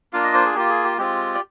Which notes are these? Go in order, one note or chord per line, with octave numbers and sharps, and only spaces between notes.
A#3 D4 F4 F5
D#5
C5
G#4
A#3 F4 G4
G#4
G4
G#3 C4 F4 G4
D5